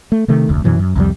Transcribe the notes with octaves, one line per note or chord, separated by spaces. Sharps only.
A3
C3 D#3 A3
F1 D2
F#2 B2 E3 F#3
F#2
C2 F2 G3